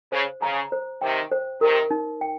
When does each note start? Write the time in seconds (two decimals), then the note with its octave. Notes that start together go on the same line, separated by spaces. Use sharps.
0.12 C#3 C5
0.42 C#3 A#5
0.72 C5
1.01 C3 D#3 G5
1.32 C5
1.61 C3 D#3 A#4
1.91 D#4
2.21 G5